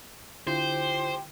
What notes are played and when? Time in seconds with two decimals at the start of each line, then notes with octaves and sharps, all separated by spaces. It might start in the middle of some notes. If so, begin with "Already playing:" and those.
0.47 D3 E4 F4 G4 C5